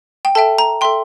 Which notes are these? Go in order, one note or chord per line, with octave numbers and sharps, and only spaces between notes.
G5
A4 E5 G5 A5
A#5
A4 E5 G5 C6